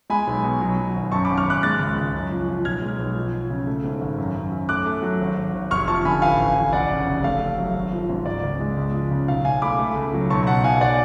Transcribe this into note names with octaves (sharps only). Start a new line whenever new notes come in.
G#3 G#5 B5
B1
B2
F#3
F#3
G#1
F#2 A5 C#6
G#1 B5 D6
C#6 F6
G#1 D6 F#6
G#3 F#6 A6
C#2
C#2
F#2
F3
F3
B1 F6 G#6
G#3
B1
F3
F3
C#3
A3
G#2
G#1
F#2
F#2
F#2
A3 D6 F#6
A3
F#3
G#1
G#1
G#1
F1 C#6 F6
F3 A5 C#6
D3 G#5 B5
A1 F5 G#5
A1
A1
F1 D5 F#5
C#3
F1
A3 F5
A3
F#3
G#1
F3
G#2
C#2 D5
C#2
G#3
C#2
F3
C#3
B1 F5
B1 F5 G#5
A3 B5 D6
A3
C#2
F#3
B1 A5 C#6
B2 F#5 A5
B1 F5 G#5
D5 F#5